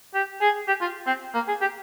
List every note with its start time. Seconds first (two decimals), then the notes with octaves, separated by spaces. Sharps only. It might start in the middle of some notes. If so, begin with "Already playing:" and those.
0.14 G4
0.41 G#4
0.68 G4
0.81 F4
1.07 C4
1.34 A#3
1.48 G#4
1.61 G4